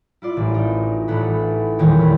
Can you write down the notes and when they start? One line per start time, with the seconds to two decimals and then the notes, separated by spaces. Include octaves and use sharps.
0.22 E4 F4 D5
0.37 A1
0.54 D#4
1.08 A1 A4 F#5 B5
1.79 D#1 A#1 E2 D#3 C#5 G5
1.98 B5